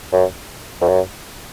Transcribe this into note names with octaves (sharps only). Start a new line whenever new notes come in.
F#2
F2
F#2